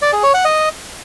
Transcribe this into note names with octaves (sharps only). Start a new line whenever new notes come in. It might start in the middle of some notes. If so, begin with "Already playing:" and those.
D5
G#4
C#5
F#5
D#5